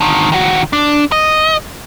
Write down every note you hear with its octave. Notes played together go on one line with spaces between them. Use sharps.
D3 D#3
D#3 F#4
D4
D#5